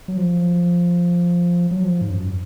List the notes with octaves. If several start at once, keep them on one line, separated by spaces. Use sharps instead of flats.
F#3
F3
F#3
F3
G#2
F#2